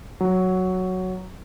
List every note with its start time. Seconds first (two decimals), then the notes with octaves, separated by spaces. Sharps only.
0.21 F#3